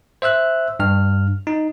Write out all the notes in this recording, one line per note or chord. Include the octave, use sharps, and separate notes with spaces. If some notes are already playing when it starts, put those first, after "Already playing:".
C5 E5 E6 F#6
G2 F6
D#4